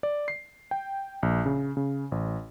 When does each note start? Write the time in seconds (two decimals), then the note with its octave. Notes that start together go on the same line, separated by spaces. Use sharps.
0.03 D5
0.28 C7
0.71 G5
1.23 A#1
1.46 C#3
1.77 C#3
2.12 A1